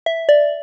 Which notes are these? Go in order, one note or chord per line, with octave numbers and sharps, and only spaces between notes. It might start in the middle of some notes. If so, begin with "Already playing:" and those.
E5
D5